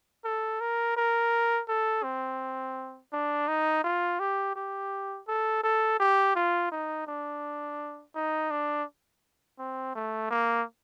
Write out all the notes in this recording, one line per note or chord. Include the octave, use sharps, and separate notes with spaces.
A4
A#4
A#4
A4
C4
D4
D#4
F4
G4
G4
A4
A4
G4
F4
D#4
D4
D#4
D4
C4
A3
A#3